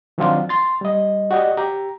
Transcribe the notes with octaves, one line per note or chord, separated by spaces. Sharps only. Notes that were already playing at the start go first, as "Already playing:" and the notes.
D#3 F3 F#3 C4 D4 F4
C6 A6
G3 D#5
F#4 G4 D5 D#5
G4 A#5